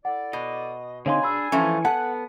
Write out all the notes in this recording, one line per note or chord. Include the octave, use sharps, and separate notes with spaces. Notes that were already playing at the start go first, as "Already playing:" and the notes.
E4 A4 D5 F#5
B2 D#5
D3 C4 D#4 C#5 F5 G#5 C6
D4 G#4 B5 E6
E3 F3 A3 C#4
B3 A4 F#5 A5 F#6